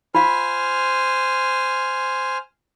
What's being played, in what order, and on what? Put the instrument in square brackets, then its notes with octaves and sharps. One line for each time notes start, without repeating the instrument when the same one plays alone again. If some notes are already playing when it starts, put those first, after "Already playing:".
[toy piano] F4 F5 [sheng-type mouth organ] C5 G#5 F6